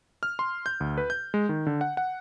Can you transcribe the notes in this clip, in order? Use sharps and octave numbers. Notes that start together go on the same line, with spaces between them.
F6
C6
G6
D2
B4
G6
G#3
D#3
D3
F#5
F#5